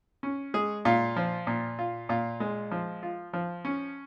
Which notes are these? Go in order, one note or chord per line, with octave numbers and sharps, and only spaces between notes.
C#4
G#3 G#4
A#2 F4
F3
A#2
F4
A#2 F4
G#3
F3
F4
F3
C#4